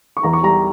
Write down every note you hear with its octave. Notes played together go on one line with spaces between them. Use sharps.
C#6
E2 A#5
C#6
G3 A#5